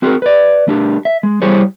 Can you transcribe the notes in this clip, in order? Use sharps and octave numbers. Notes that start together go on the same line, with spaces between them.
C4 F#4 G#4 A#4
B4 D5
A3 D4 G4
E5
G#3
G3 E4 G4 G#4 C5 C#5